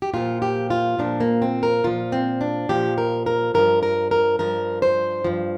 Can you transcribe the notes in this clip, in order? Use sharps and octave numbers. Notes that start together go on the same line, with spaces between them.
G4
A#2 F3 F4
G4
F4
A#2 F3 D4
A#3
C4
A#4
A#2 F3 F4
C4
D4
A#2 F3 G4
A#4
A#4
G2 F3 A#4
A#4
A#4
G2 F3 A#4
C5
G2 F3